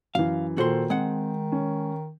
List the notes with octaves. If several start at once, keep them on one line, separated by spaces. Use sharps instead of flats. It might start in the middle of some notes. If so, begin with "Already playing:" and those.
F#2 E3 F5
A#2 D#3 F#4 A4 C5 C6
G#3 C4 F#5
C#4